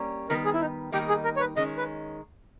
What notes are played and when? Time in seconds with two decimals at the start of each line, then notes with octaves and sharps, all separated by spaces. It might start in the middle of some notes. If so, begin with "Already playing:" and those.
Already playing: G3 A#3 C#4
0.29 D#3 G3 B3 A#4
0.45 G#4
0.54 E4
0.61 D#4
0.92 D#3 G3 A#3 D#4 G4
1.09 G#4
1.24 A#4
1.36 C#5
1.40 B4
1.57 D#3 G#3 C#4 D#5
1.77 B4